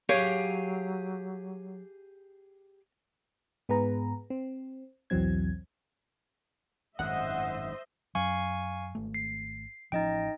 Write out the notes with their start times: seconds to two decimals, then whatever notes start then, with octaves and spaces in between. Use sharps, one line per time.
0.09 F#3 G4 G#4 C#5 F5
3.69 G#2 B3 G#4 B4 A#5
4.30 C4
5.10 B1 E2 E3 F#3 C4 G#6
6.99 G#1 F#2 A2 C5 D#5 E5 F#5
8.15 F#2 F#3 F5 G#5 C#6
8.95 G#1 A3
9.14 C7
9.92 A1 F3 C#4 D#4 D#5 G5